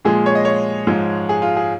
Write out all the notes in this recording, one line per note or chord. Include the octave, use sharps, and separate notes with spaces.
A#2 F3 G#3 G#4
C#5
D#5
C#5
G#2 F3 G#3
G#4
F4
G#4